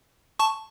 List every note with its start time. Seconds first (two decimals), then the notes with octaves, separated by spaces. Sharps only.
0.39 A5 C#6